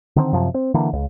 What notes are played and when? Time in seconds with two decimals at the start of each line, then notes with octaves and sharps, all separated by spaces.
0.16 D3 D#3 C4
0.33 F#2 C3 F3
0.54 C4
0.74 D3 E3 A#3
0.93 C#2